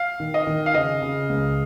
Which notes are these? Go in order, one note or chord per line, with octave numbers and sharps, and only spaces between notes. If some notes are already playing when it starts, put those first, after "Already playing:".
Already playing: F5
D#3
D#5
D#3
F5
C#3 D#5
C#3
C#2